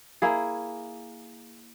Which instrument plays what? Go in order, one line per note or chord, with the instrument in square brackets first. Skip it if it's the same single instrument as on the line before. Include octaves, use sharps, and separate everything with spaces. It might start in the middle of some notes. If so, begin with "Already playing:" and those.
[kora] A#3 E4 G#4